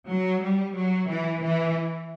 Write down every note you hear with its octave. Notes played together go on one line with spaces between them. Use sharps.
F#3
G3
F#3
E3
E3